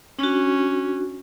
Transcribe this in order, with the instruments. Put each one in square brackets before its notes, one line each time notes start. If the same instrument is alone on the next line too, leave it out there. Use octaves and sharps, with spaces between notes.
[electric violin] C#4 [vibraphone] D4 F#4